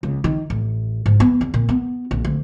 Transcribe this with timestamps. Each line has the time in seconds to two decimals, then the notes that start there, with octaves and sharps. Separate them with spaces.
0.03 C#2
0.24 D#3
0.50 A1
1.06 G#2
1.20 B3
1.41 E2
1.54 A#2
1.69 B3
2.11 A#1
2.24 D2